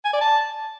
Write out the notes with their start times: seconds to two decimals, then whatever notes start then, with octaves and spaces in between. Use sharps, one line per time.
0.05 G#5
0.13 D5
0.21 A5